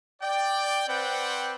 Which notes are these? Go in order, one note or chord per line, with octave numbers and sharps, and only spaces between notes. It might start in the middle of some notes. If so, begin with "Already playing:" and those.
D5 G5
C4 B4 C5 D5 F#5 G5